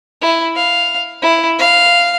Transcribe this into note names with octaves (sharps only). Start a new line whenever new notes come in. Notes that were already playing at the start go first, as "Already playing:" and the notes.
E4
F5
E4
F5